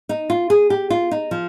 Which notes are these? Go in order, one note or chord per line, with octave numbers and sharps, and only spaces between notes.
D#4
F4
G#4
G4
F4
D#4
F3